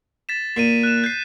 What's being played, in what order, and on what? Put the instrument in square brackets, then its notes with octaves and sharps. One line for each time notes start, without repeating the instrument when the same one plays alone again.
[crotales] A6 B6 E7
[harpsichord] A#2 [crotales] C7 D#7
[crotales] F#6 E7
G6 C7